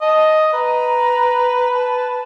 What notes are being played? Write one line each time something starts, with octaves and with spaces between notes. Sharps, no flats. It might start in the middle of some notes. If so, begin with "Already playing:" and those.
D#5 A5
B4 A#5
A5